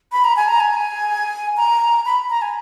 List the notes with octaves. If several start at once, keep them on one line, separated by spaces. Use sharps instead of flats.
B5
A#5
G#5
A#5
G#5
A#5
B5
A#5
G#5